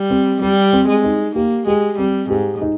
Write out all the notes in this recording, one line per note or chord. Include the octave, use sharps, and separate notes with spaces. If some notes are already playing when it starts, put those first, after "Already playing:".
Already playing: G3
C4
G3 G4
C4
G#3
D#4
A#3 G4
G#3 G4
G3 C4
G#2 G4
D#4